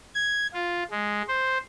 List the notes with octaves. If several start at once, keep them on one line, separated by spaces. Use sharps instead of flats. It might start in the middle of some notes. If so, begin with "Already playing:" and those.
G#6
F4
G#3
C5